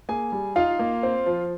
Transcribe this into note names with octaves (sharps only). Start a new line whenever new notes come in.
A#3 G#4 G#5
G3
D#4 F4 F5
A#3
C4
F3